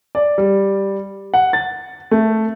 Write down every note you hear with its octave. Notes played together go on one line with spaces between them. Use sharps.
D5
G3
F#5
A6
A3